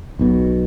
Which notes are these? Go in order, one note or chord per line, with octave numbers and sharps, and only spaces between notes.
B1 B2